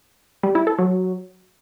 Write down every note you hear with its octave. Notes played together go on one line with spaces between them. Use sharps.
G3
E4
A4
F#3